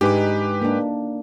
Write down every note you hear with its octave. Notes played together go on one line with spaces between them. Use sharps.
G#2 G#3 D4 D#4 G4 B4 D6
A#3 D4